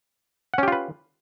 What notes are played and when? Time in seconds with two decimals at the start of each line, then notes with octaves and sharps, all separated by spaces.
0.54 F#5
0.58 C#4
0.63 G4
0.68 F4
0.72 B4